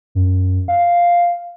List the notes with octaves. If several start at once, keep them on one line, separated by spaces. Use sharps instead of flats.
F#2
F5